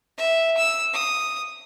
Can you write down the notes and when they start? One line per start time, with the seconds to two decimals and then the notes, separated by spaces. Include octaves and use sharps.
0.18 E5
0.57 E6
0.94 D#6